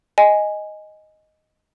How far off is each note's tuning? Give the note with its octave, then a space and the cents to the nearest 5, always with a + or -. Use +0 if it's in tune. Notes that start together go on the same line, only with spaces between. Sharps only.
D#5 +0 G#5 +0